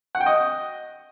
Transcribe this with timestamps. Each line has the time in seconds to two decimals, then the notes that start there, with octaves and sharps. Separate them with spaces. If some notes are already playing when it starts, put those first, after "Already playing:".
0.15 F#5
0.20 G5
0.26 D#5